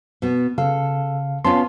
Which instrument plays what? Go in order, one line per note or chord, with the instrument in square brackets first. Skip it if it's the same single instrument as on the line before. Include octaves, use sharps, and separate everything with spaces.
[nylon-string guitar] B2 B3
[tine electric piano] C#3 F5 [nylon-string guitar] A4
[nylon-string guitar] B3 C#4 F4 [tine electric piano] A5 C6